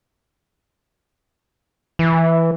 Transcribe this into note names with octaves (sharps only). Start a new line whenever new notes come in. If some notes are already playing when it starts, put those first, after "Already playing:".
E3